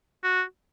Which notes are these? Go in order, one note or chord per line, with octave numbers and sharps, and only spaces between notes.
F#4